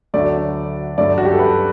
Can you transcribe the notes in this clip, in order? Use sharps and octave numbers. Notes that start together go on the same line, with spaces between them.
D2 D3 F#3 A3 D5
G2 F#3 A3 D5
F#4
G4
A4
B4